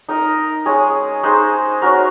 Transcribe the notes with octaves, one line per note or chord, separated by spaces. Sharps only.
D#4 A#4 D#5
G#3 C#4 G#4
G#3 D#4 G#4 C5
C#4 F#4 A#4